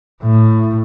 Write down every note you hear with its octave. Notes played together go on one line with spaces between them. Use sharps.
A2